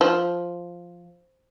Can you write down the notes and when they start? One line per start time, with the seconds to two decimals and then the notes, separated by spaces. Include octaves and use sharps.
0.01 F3